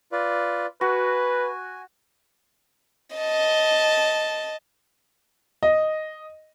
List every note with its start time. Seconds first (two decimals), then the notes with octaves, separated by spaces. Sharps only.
0.12 F4 B4 D5
0.81 F#4 B4 G#5
3.16 D#5 A5
5.63 D#5